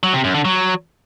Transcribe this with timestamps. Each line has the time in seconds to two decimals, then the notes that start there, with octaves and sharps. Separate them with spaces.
0.03 F#3
0.14 C3
0.24 F#2
0.34 D3
0.45 F#3